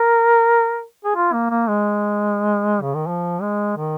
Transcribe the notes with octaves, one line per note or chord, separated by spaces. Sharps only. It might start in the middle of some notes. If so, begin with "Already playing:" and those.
Already playing: A#4
G#4
F4
A#3
A#3
G#3
C#3
D#3
F3
G#3
D#3